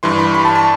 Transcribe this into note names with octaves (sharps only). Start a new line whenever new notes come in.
G2 E3 C6
B5
B5
A5
A5